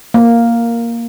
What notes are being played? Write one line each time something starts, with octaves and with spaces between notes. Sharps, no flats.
A#3